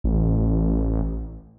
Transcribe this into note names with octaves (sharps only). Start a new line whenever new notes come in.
A1